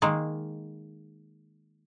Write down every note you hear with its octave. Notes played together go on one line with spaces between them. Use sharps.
D#3 G#3 A#3